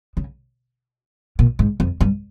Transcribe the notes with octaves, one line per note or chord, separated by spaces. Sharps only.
C#3
A#2
G#2
F2
G2